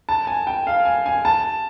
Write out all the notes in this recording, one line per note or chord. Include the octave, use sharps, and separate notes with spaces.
A5
G#5
G5
F5
G#5
G#5
A5